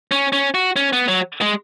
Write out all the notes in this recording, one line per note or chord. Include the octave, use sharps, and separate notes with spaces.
C#4
C#4
F#4
C#4
B3
F#3
G#3